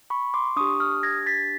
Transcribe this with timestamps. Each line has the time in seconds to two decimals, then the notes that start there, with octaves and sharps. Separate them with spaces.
0.10 B5 C#6
0.34 C6 D6
0.56 D4 G4 C#6 D#6
0.80 D#6 F6
1.03 G#6 A#6
1.26 A6 B6